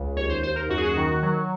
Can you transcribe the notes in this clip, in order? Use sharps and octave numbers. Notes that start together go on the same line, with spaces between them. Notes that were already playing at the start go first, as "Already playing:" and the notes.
Already playing: C#2
D#2 C#5
C5
D#2 C5
A#4
F#2 F#4
G#4
F#4
D#3
F#3